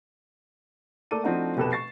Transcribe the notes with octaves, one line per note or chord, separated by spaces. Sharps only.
A3 A#3 A4 D5 D6 D#7
F3 A3 C4 D4 D#4 F#4
F1 B2 G4 A4 B4 E7
C#6 A6 C7